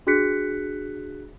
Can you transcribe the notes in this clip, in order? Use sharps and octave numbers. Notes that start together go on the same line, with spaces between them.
D4 F#4 G#4 F#6 B6 C#7